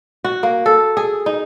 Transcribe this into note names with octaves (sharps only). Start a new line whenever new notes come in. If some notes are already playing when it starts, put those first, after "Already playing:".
F#4
A#3
A4
G#4
D#4